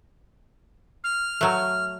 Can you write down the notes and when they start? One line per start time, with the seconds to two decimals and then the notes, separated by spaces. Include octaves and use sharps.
1.04 F6
1.41 F#3 A3